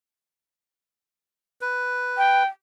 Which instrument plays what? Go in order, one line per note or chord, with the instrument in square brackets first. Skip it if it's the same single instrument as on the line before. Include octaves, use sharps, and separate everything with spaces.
[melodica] B4
[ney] G5